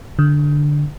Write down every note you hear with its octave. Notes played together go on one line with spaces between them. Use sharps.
D3